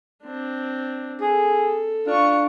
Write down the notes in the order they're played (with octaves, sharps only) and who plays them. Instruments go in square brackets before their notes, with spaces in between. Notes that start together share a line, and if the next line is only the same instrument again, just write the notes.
[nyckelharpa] C4 D4
[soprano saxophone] G#4 [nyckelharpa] A4
[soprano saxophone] D4 [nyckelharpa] F4 C#6